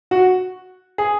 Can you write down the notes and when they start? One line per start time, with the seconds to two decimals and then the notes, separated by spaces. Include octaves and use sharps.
0.11 F#4
0.98 G#4